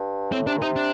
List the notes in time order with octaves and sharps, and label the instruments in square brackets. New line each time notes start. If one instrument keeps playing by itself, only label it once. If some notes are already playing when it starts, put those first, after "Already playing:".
Already playing: [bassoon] G2
[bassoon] A2 [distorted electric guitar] C4
[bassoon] C3 [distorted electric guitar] D4
[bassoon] A#2
[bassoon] C3 [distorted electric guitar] D#4
[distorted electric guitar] D4